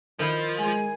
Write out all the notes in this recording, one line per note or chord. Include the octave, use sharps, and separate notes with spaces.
D#3 F3 E4
G#3 G#5